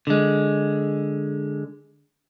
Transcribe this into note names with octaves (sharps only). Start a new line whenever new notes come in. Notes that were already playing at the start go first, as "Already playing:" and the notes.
D3 G#3